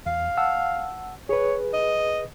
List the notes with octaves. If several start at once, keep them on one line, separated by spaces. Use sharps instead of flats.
E2 F5
F#5 A5 E6
G#4 B4 C#5
D#5